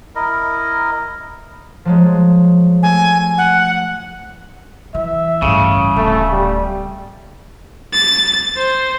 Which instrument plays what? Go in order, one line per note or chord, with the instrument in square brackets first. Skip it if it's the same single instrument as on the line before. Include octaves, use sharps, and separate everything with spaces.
[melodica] E4 A#4 D#5
[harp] F3 F#3 G#3
[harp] A3 [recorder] G#5
[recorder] F#5
[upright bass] E3 [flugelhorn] E5
[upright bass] A1 G2 [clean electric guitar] C#3
[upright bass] D1 [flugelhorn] A3
[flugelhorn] G3
[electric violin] A6
C5